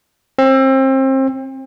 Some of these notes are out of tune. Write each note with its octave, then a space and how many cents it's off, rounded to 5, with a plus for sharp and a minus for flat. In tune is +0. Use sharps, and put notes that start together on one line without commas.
C4 +30